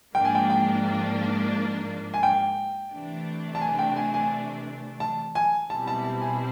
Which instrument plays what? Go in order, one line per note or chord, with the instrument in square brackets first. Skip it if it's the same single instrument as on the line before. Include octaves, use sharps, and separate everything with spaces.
[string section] G#2 F3 A#3 D4 [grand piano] G5
[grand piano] G#5
G5
G5
G#5
G5
[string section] C3 E3 A3 D4
[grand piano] A5
G#5
G5
G#5
G#5
A5
G#5
[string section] B2 G3 C4 E4 [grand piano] A5
[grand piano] A5
A5
G#5